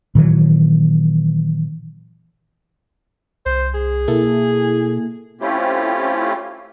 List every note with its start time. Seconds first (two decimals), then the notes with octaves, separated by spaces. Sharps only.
0.15 A#2 D#3 E3 F#3
3.46 C2 C5
3.74 G#4
4.08 B2 A#3 E4 A4
5.41 A3 C4 C#4 E4 F4 G4